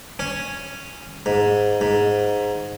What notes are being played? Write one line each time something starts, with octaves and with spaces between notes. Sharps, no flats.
C#4
G#2
G#2